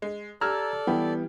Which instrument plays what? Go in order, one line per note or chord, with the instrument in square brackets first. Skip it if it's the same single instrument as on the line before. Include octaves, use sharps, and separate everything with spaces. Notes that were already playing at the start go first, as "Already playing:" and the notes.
[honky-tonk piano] G#3
[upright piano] G4 [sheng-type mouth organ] A4 D5 [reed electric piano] A#5 E6 G#6 [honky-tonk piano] F6
[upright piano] E3 G3 E4 [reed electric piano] B3 [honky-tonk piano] G4